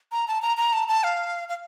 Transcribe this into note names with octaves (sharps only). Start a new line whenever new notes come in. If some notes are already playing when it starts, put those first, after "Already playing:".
A#5
A5
A#5
A#5
A5
A5
F5
F5